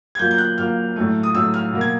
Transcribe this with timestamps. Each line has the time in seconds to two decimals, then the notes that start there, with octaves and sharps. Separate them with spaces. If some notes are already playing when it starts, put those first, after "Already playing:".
0.15 G#6
0.19 A#2 F#3 A#3 G6
0.31 G6
0.38 F#6
0.58 A#2 F#3 A#3 F6
0.96 A2 F#3 A3
1.23 D#6
1.35 A2 F#3 A3 E6
1.54 F6
1.73 B2 F#3 A#3
1.81 G#6